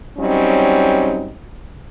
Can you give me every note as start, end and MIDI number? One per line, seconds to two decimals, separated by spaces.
0.18 1.31 54
0.18 1.31 55
0.18 1.31 60
0.18 1.31 61
0.18 1.31 63